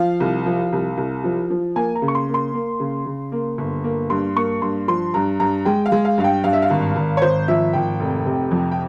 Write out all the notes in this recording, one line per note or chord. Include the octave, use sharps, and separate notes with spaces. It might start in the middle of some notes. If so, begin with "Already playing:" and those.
Already playing: F3 F5
C2
F3
C2
C2
F3
F3
A#3 G#5
A#5
C#3
C#6
C6
A#3
C6
A#3
C#3
C#3
A#3
G1
A#3
G2 C6
A#3 C#6
G2 C6
F3 C6
G2 A#5
G2 A#5
G#3 G5
F5
G#3
F5
G2 F5
G5
G2 F5
E5
F5
G#1
G#1
C#5
G#1 C5
F3 E5
G#1 G5
F1
C3
F2
G5